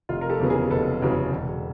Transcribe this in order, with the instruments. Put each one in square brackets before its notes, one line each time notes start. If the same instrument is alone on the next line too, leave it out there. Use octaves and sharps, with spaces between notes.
[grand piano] F1 F4
A#4
G4 A4
E2 C#3 F#3 B3
G#4 A#4
F1 A4 B4
E2 C#3 F#3 B3
E1